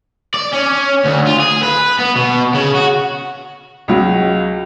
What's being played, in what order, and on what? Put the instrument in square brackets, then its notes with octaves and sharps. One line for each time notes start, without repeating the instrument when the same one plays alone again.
[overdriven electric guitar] D5
C#4
D2
F4
G#4
B4
B3
B2
C#3
F#4
[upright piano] C#2 F#3